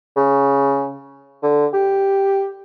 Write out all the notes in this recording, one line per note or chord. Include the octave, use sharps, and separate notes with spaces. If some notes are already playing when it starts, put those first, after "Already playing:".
C#3
D3
G4